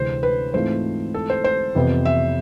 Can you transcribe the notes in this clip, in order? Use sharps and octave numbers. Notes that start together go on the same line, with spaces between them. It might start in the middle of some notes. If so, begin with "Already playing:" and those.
Already playing: D2 C3 E3 G#3 C5
B4
G#2 E3 A3 C4 F4 C5
A4
C5
C5
F2 C3 E3 B3 E4
E5